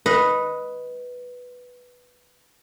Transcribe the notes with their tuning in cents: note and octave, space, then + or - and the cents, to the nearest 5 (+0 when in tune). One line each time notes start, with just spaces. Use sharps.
B4 +0 D#5 +5 F#5 -30